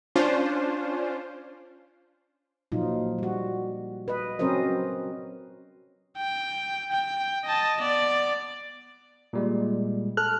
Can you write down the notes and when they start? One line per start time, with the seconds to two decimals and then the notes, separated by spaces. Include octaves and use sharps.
0.16 C#4 D4 F4 C5
2.72 A#2 F3 F#3 D#4 F4
3.19 G3 F#4
4.08 B4 D#5
4.39 F#3 C4 C#4 A#4 C5 D#5
6.17 G5
6.92 G5
7.45 D#5 A5
7.81 B3 D5
9.33 A#2 G3 G#3
10.17 A4 F6 F#6